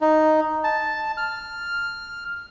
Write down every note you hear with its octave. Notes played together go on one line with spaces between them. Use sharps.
D#4
A5
F6